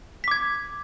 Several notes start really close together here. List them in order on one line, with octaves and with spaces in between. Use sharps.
B6 D6 G#6